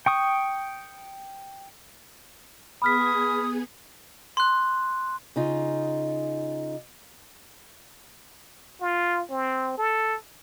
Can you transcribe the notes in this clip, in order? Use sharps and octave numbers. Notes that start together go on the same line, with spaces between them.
G5 C#6 D#6
B3 G#4 B5 D#6 F6 G#6 B6
C6 F#6
C#3 D#4 F4
F4
C4
A4